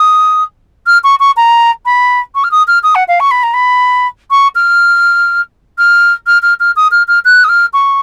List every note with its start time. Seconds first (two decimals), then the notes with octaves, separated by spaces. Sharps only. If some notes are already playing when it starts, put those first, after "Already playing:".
Already playing: D#6
0.87 F6
1.04 C#6
1.20 C#6
1.37 A#5
1.85 B5
2.35 C#6
2.44 F6
2.51 D#6
2.67 F6
2.83 D#6
2.95 F#5
3.08 F5
3.20 C#6
3.31 B5
3.43 A#5
3.54 B5
4.31 C#6
4.55 F6
5.78 F6
6.27 F6
6.42 F6
6.60 F6
6.76 D#6
6.91 F6
7.08 F6
7.25 F#6
7.44 D#6
7.49 F6
7.73 C#6